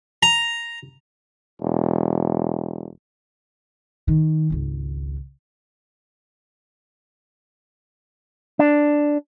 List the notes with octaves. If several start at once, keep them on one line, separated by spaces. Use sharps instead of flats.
A#5
E1
D#3
G#1 C#2
D4